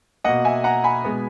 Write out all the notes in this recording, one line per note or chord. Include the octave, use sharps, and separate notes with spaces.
B2 A#3 D#5 F#5
E5 G#5
F#5 A#5
G#5 B5
B2 G#3 B3